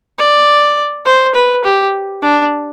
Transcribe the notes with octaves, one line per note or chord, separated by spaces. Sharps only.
D5
C5
B4
G4
D4